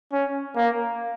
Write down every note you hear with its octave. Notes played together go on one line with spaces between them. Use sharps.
C#4
A#3